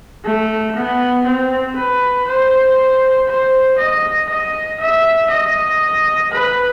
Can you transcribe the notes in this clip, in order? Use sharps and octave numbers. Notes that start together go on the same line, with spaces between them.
A3
B3
C4
B4
C5
C5
D#5
D#5
E5
D#5
B4